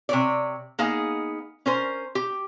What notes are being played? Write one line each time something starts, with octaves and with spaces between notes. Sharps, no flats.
C3 C#5 D5
A#3 B3 D#4 G#4 F5
C#4 A#4 C5
G4